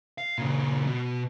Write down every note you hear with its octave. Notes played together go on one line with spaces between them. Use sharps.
F5
A#2 C#3
B2